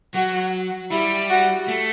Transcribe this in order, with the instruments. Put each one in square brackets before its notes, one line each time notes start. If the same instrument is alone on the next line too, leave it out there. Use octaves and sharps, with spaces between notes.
[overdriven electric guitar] F#3 [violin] F#4
[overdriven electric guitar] G3 [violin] E4
[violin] F#4
[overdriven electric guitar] A3